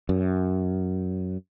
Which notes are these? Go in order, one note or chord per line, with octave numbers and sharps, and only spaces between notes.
F#2